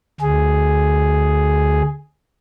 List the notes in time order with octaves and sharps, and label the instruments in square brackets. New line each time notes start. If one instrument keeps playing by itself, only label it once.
[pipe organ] D2 G#4